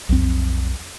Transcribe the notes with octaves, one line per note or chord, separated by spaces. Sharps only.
B1 F2 C4